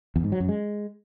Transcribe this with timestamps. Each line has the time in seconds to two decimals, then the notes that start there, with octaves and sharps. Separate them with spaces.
0.16 E2
0.24 G#2
0.32 F#3
0.40 F#2
0.49 G#3